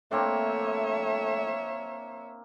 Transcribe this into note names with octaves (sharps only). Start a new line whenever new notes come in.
A3 A#3 C4 D4 C#5 E5